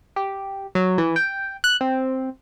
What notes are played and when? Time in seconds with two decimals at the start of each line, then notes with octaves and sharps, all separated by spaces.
0.16 G4
0.75 F#3
0.98 E3
1.16 G5
1.64 F#6
1.81 C4